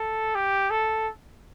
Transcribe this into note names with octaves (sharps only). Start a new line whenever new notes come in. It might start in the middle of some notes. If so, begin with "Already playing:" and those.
Already playing: A4
G4
A4